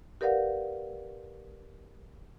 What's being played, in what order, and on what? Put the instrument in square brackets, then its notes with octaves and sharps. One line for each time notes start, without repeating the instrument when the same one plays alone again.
[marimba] G4 A#4 B4 D5 F5 F#5